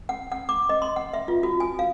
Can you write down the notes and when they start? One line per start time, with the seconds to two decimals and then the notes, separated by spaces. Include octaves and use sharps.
0.09 F#5
0.32 F#5
0.49 D6
0.69 D#5
0.82 C6
0.96 F#5
1.13 E5
1.28 F4
1.43 F#4
1.60 G#5
1.79 F5